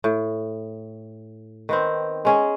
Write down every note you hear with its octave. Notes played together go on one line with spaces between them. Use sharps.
A2
D#3 B3 C4
G#3 C#4 G#4